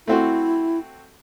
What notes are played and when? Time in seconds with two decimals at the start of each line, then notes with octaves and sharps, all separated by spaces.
0.07 A3 C4 E4 F#4